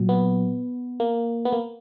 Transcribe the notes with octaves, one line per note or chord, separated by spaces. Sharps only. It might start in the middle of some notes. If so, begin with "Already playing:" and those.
Already playing: A#2 F#3
B3
A#3
B3
A#3